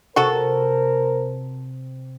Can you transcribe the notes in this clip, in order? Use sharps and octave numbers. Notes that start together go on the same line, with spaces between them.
C3 F#4 A4 A#4 C5